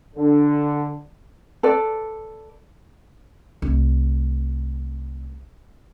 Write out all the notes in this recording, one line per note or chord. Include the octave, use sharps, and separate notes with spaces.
D3
A4 B4 D5
C2 A3